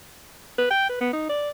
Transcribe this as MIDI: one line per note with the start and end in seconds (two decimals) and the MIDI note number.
0.58 0.69 71
0.71 0.88 79
0.89 1.00 71
1.01 1.10 59
1.13 1.26 63
1.29 1.50 74